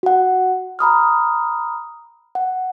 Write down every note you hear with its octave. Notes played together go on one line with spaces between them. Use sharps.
F#4 F#5
A#5 B5 D#6 F6
F#5